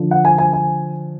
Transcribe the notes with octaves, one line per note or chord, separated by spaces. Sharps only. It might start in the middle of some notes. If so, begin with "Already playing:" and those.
Already playing: D3 F3
F#5
G#5
G#5
G#5